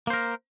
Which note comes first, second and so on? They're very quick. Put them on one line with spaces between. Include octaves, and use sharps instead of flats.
A#3 C5 A#4